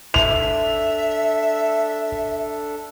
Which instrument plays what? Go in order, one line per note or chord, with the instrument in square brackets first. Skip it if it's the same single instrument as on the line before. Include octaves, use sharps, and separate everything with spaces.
[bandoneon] D4 A4 [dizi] E5 [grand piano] F7